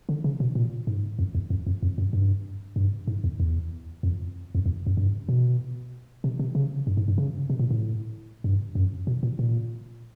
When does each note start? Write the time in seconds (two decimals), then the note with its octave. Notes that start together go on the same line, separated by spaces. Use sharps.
0.09 D3
0.24 C#3
0.40 B2
0.55 A#2
0.87 G#2
1.19 F2
1.35 E2
1.50 F2
1.67 F2
1.83 F2
1.98 F#2
2.13 G2
2.76 G2
3.07 G#2
3.24 E2
3.40 E2
4.03 F2
4.55 F2
4.66 E2
4.87 F#2
4.97 G2
5.29 B2
6.24 C3
6.39 C3
6.55 C#3
6.87 G2
6.97 G#2
7.08 G2
7.18 C#3
7.50 C3
7.59 A#2
7.71 A2
8.44 G2
8.75 F#2
9.07 B2
9.23 A#2
9.39 A#2